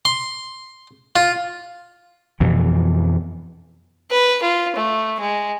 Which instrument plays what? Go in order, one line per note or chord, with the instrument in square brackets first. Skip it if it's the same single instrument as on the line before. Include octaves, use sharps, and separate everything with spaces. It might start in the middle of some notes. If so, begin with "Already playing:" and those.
[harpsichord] C6
F4
[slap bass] F2 B2 E3 F3
[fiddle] B4
F4
A3
G#3